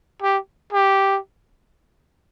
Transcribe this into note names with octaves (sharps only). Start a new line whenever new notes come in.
G4
G4